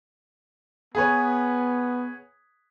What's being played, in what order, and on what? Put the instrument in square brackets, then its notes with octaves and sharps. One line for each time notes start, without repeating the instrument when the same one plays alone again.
[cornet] B3 [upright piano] G#4 B4 C#5